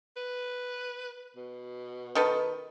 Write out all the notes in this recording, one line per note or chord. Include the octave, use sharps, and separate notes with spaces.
B4
B2
D#3 A4 B4